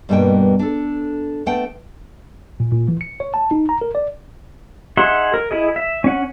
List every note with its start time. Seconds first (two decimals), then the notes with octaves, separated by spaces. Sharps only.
0.09 G2 B2 G3 A#3 D#5 G5
0.59 D4 A4
1.46 A3 B3 F#5 G5 A5
2.60 A#2
2.72 A#2
2.88 E3
3.01 C#7
3.20 C#5
3.34 A5
3.51 D#4
3.69 A#5
3.81 A#4
3.95 D5
4.97 D#4 G#4 E5 F#5 C6
5.34 A#4
5.51 E4 G#4 D#5
5.76 E5
6.04 C#4 F#5